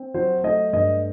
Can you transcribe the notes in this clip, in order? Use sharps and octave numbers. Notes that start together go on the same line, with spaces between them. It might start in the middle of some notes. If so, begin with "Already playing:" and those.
Already playing: C4
F#3 C5
A3 D#5
G2 D#5